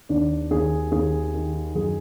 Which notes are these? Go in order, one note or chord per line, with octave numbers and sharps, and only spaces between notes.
D#2 D4
D#2 G#4
D#2 G#4
D#3
F#2 G#4